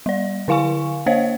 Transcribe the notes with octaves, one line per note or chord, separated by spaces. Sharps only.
G3 D5
D3 E4 F5 G#5 C#6
A#3 C5 C#5 D#5 F5